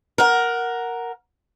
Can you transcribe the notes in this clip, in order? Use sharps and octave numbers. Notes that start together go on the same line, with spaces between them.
A#4 F#5